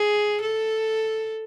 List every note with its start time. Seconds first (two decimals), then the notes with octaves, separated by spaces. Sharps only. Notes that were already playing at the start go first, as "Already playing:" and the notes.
Already playing: G#4
0.41 A4